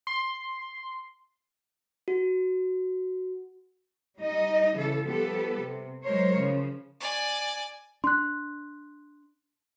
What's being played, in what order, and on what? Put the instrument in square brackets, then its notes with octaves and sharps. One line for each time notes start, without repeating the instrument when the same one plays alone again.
[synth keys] C6
[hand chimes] F#4
[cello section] G3 D#4 D#5
C#3 E3 A4
F3 G3 B3 G4 A4 B4
C3
F#3 G#3 A#4 C5 C#5
C#3 F3
[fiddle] D5 G#5
[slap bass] D4 [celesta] C6 F#6